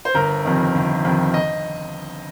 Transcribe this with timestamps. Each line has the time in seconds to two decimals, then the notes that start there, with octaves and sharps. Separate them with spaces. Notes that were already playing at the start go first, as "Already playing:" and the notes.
0.05 C5
0.14 G1 A#4
0.45 F2 C3 D#3
0.74 G1
1.04 F2 C3 D#3
1.34 D#5